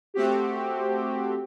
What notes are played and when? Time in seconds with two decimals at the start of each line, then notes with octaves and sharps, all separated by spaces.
0.14 A3 C4 F#4 G4